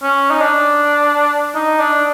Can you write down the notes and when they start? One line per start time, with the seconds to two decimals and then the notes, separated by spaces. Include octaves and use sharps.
0.03 C#4
0.31 D#4
0.41 D4
1.55 D#4
1.80 D4